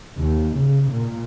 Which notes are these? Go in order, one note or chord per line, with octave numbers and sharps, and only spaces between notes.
D#2
C#3
A#2